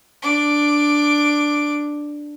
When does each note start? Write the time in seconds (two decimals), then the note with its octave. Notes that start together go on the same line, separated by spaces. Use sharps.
0.22 D4 D6